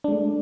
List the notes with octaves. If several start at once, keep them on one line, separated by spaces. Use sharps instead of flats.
G#3 A3 D4